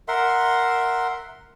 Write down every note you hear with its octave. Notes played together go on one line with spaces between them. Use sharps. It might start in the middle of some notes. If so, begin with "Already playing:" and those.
A#4 E5 F#5 C6